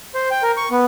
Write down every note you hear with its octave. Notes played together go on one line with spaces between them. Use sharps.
C5
G5
A#4
C#6
B3